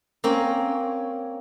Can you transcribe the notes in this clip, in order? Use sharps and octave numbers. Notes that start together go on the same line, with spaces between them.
A#3 C4 C#4